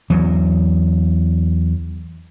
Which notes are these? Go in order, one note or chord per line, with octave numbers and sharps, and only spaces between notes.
E2 F#3